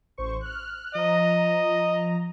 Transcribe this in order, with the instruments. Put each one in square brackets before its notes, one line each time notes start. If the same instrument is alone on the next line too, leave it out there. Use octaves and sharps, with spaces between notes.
[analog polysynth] A1 C5 C#6
F6 F#6
[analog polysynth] F3 A#5 [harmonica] D#5